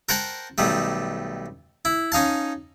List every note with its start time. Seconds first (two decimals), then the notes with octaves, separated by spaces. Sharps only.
0.09 A#4 C5 F#5 G5 A5
0.58 B1 D#3 G3 A3
1.85 E4
2.12 C#4 D#4 F5 A5